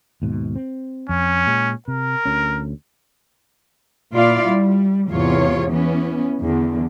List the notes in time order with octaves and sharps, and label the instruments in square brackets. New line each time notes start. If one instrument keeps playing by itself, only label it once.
[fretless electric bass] D#2 G#2 B2
C4
[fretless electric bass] F2 [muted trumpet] C#4
[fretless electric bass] A#2 G#3
[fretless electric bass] C3 [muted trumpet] A#4
[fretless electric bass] D2 C#4
[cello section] A#2 E4 F4 D5 F5
G3
E2 G#2 C3 F4 C#5
E3 B3 C#4
E2 D3